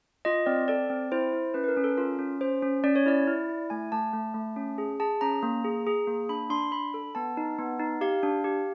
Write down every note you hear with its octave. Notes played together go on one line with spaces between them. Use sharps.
F4 D#5
C4 D5
A4 D5
C4
E4 C5
E4
C#4 B4
B4
A#4
C#4
A4
F4 A#4
C#4
C#4 C5
C#4
C#4 D5
C#5
E4 D5
E4
E4
A3 G#5
A3 A5
A3
A3
C#4
G#4
G#4 A5
C#4 A#5
A#3
G#4
G#4
A#3
D4 B5
D4 C6
D4 B5
A4
B3 A5
D#4
B3
D#4
G4 F5
D4
G4